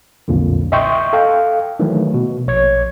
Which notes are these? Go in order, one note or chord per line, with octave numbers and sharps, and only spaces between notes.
B1 F2 A#2 D3
D#5 E5 G5 C6 C#6 G6
A4 F5 G5
D#3 E3 F#3 A3
B2
A#1 C#5 G#6